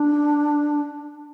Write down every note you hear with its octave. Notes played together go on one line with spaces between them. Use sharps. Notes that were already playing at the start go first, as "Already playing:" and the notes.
Already playing: D4